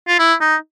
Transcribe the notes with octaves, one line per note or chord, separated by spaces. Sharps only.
F4
E4
D#4